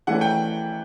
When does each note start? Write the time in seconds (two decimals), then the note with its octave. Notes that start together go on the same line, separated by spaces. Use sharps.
0.07 E3 A3 C#4 F#5
0.21 G5